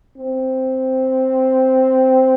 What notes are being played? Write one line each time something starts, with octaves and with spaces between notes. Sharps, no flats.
C4